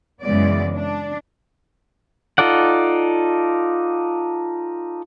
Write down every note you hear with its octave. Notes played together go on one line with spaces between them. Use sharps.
F#2 C#3 E3 G#3 B3 D5
D4
D#4 F4 A4 D5 F#5